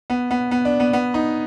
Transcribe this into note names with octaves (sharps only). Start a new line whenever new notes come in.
B3
B3
B3
D4
B3
B3
D#4